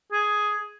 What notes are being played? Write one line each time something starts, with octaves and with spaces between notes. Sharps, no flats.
G#4